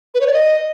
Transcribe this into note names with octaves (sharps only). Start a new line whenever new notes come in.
B4
C#5
D5
D#5